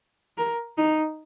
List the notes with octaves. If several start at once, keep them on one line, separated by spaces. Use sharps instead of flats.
A#4
D#4